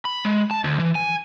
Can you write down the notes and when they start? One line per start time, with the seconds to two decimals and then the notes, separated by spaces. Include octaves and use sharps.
0.05 B5
0.25 G#3
0.51 A5
0.64 D2
0.80 E3
0.95 G#5